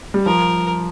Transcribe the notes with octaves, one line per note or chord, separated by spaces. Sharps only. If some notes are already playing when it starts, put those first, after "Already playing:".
G3
F3 A#4